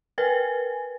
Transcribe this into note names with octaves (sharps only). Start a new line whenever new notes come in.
A#4 B4 G#5